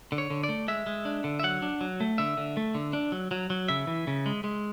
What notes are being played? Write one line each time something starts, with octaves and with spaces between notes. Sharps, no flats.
D3
C#5
D3
D5
A3
G#3 E5
G#3
D4
D3
E5
F#3 F#5
D4
F#3
A3
D3 E5
D3
A3
D3
D4
F#3
F#3
F#3
C#3 E5
E3
C#3
G#3
G#3